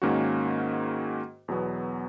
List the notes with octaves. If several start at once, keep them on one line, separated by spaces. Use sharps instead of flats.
G#2 D#3 A#3 C#4 F#4
E2 B2 F#3 B3